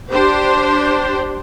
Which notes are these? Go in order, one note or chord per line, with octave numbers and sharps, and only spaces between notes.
D4 G4 C5